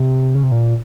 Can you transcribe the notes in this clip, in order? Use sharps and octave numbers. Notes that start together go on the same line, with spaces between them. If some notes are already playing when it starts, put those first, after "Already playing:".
Already playing: C3
C#3
C3
A#2